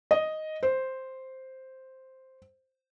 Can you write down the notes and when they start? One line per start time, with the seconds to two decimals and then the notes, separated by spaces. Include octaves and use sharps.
0.11 D#5
0.63 C5